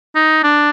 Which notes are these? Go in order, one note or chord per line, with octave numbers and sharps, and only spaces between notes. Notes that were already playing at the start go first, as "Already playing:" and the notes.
D#4
D4